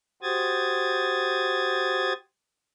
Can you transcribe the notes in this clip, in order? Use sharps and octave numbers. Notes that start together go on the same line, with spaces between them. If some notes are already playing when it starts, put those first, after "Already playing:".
F#4 G4 C5 D#6 G#6 A6